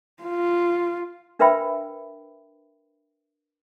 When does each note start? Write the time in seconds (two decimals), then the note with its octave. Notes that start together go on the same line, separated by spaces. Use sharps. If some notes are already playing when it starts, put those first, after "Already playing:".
0.23 F4
1.39 D4 A#4 B4 E5 G5 B5